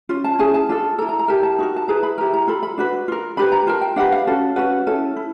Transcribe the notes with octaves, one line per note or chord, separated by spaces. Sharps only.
C#4 F4
A5
C#4 E4 G#4 G#5
A5
D4 F4 A4
E4 A4 A#5
A#5
A#5
E4 G4 A#4 A5
A5
D#4 F#4 A#4
A5
E4 G#4 B4 A#5
B5
E4 G4 A#4 A#5
A#5
F4 A4 B5
B5
D4 F#4 B4
F4 A#4
D4 G4 B4 B5
A#5
F4 A#4 A5
G5
D4 G4 B4 F#5
F5
C#4 F#4 A4
C#4 F#4 B4 F#5
C#4 E4 A4
E4